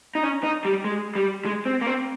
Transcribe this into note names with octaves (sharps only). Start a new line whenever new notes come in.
D#4
C#4
D#4
G3
G#3
G3
G#3
C4
A#3
C4